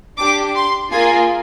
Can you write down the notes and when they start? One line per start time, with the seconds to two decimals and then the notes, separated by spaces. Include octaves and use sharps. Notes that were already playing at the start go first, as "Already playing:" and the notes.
0.18 D4 G4 D6
0.55 C6
0.91 A#3 F4 G#4 G#5